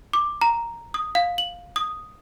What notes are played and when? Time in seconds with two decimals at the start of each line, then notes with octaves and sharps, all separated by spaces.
0.13 D6
0.42 A#5
0.94 D#6
1.15 F5
1.38 F#7
1.76 D#6